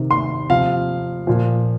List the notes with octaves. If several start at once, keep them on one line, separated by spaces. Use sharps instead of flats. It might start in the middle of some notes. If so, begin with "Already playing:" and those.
Already playing: C3 D#3
C6
C3 F3 F5
A#2 F3